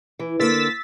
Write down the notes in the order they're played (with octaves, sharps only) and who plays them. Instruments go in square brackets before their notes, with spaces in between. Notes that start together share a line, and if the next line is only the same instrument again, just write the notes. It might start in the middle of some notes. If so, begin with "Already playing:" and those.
[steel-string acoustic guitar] E3
[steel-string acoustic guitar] D3 A#3 [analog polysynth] E6 A6 B6